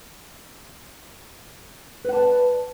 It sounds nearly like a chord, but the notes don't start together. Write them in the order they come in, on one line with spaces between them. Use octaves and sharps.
B4 F#5 A5 D5